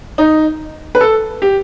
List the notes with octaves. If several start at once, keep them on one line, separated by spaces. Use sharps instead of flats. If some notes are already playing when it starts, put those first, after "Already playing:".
D#4
B4
A4
G4